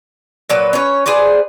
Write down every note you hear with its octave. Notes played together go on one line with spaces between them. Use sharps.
A#2 F#3 B4
C#4 B4 C#5
G#4 B4 C5 D5